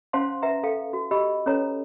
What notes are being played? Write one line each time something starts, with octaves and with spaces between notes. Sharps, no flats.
C#4 C5 F5 F#5 A5 C6
B4 E5 F#5 A#5
A4 F5 G5
F#4
G4 D#5 B5 E6
C#4 A4 B4 C#5 A#5